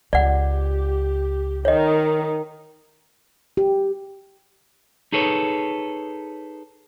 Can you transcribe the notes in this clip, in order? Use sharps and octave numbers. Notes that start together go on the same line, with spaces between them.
C#2 G4 D5 F#5
D#3 C#5 D#5
G4
D#4 G#4 A4 B4 C#5